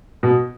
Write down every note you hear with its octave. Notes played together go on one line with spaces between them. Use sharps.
B2